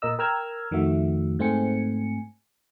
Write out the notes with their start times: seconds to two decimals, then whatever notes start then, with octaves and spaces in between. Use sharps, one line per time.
0.02 A#2 A#4 D#5 E6
0.19 A#4 G5 A#5 E6 F6 G#6
0.71 F2 D#3 F3 A3 F#4 E5
1.39 G#2 A3 C4 G#5 C#7